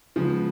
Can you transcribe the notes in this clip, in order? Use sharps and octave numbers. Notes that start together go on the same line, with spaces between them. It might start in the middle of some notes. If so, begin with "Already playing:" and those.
C#3 F3 G#3 B3